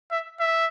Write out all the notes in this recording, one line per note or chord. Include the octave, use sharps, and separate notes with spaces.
E5
E5